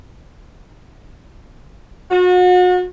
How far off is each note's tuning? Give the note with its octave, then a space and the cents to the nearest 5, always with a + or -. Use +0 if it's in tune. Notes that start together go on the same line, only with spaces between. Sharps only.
F#4 -35